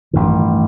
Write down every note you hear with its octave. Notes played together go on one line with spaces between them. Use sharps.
A1 G2 D#3